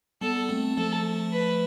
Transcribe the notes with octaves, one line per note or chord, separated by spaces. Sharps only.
G3 B3 A4
A3 C4
F3 A3 A4
B4